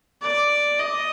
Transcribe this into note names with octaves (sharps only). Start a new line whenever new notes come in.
D5
D#5